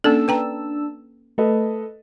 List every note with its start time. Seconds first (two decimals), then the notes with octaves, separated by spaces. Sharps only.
0.04 A#3 C#4 D4 A4 A5 E6
0.28 B4 G5 A#5
1.38 A3 A4 B4 D#5